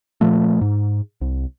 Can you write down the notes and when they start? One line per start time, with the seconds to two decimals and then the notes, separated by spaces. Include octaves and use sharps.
0.21 A#2 F3 A3
0.61 G#2
1.21 C2